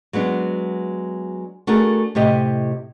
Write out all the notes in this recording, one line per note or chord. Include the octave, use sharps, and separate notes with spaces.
F#3 G#3 B3 D4
A3 D4 F#4 G#4 A#4
A2 C3 G4 D#5